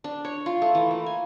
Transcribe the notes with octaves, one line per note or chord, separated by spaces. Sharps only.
D4
C#5
F4
A3
E3
A#3
G#5